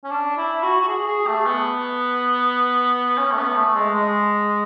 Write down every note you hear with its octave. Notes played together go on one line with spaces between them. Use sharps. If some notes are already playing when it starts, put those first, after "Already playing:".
C#4
D4
E4
F#4
F#4
G#4
G#4
A3
B3
C#4
A3
B3
A3
G#3
G#3